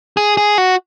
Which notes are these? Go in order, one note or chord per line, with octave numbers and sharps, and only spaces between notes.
G#4
G#4
F#4